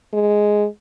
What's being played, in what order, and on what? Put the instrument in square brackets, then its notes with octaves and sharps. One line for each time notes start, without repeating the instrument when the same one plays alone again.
[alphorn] G#3